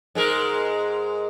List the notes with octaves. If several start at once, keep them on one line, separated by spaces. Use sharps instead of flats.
G#2 G#3 A#4